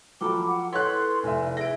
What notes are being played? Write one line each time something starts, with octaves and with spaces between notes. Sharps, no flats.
F3 F#3 A4 G5 B5 D6
F#5
E4 A4 B4 C#5 C6 F#6
F1 E5 G#5
E4 G#4 E5 A#6 D7